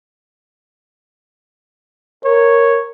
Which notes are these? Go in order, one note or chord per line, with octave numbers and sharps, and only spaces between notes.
A#4 C#5